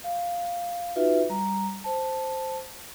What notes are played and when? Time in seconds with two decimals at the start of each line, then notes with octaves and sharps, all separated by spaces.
0.04 F5
0.96 D#4 F4 F#4 B4 E5
1.29 G3 A#5
1.84 C5 A5